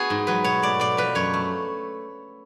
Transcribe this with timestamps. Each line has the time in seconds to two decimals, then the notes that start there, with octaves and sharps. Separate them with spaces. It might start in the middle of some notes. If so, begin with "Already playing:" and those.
Already playing: B3 F#4 G#4
0.10 G#2
0.27 F#3 B4
0.44 B2 C#5
0.62 A3 D5
0.80 B2 D5
0.97 F3 B4
1.15 F#2 C#5
1.34 A3